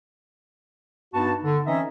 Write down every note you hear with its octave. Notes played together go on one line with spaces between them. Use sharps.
G2 B3 D#4 F#4 A5
D3
E3 C4 C#4 D#4 D#5 E5